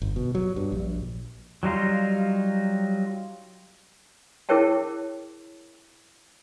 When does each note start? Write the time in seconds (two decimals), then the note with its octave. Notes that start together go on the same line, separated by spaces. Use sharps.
0.02 G1
0.16 B2
0.35 F#3
0.56 G2
0.72 A#1
1.63 F#3 G3 D#4 F4
4.49 E4 G#4 A#4 C#5 G5 A5